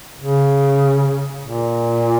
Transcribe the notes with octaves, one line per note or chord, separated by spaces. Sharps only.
C#3
A#2